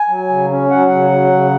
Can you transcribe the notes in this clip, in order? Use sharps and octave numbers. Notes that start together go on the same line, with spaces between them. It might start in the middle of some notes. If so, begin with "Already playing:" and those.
Already playing: G#5
F#3
C#3
C#4
F#3 F#5
C#3
F#3
C#3